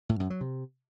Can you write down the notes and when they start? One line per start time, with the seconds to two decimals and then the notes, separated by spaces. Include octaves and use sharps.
0.09 A2
0.20 F#2
0.30 F#3
0.41 C3